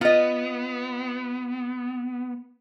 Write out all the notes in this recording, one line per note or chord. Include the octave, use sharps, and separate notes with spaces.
B3 F4 D#5